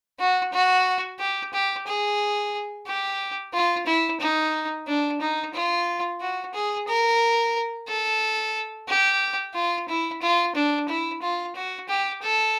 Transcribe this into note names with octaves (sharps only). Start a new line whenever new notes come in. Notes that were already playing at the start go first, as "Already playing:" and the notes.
F#4
F#4
G4
G4
G#4
G4
F4
E4
D#4
D4
D#4
F4
F#4
G#4
A#4
A4
G4
F4
E4
F4
D4
E4
F4
F#4
G4
A4